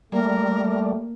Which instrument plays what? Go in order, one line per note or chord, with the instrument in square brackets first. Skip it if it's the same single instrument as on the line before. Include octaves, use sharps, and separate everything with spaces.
[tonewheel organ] G3 [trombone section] A3 [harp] A#3 [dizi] A#4